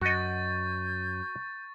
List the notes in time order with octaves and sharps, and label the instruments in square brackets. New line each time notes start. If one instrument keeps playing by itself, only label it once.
[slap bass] F#2 [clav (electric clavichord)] F#4 D#5 [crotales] C#6 A6 [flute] G6